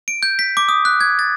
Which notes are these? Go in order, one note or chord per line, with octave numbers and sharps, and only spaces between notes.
D7
G6
B6
D6
D#6
F#6
G#6
A6